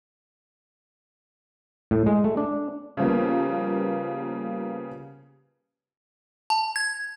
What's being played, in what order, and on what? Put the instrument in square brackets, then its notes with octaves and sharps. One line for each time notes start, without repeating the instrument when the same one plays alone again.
[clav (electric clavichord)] A2
G#3
A3
D4
[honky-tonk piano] C#3 F3 G3 A#3 B3
[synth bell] A5
G#6